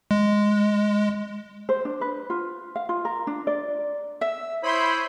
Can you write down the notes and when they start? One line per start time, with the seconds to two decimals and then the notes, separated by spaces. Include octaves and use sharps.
0.11 G#3
1.69 C5
1.85 D4
2.01 B4
2.30 F4
2.76 F5
2.89 F4
3.05 A#4
3.27 D4
3.47 D5
4.21 E5 E6
4.63 E4 C5 C#5 B5 C6 D#6 G6